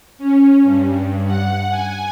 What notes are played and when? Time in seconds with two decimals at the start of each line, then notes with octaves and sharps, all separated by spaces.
0.18 C#4
0.64 G2
1.26 F#5
1.70 G#5